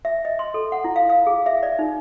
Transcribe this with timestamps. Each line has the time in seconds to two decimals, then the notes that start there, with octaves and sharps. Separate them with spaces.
0.05 E5
0.25 D#5
0.39 C6
0.54 A4
0.72 F#5
0.84 E4
0.96 F5
1.09 F5
1.27 G#4
1.46 E5
1.63 D5
1.79 D#4